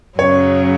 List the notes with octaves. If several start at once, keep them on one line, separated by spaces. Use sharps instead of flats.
F#2 C#3 F#3 C#4 C#5